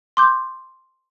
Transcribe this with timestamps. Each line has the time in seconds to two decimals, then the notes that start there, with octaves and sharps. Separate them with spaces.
0.17 C6 D6 G6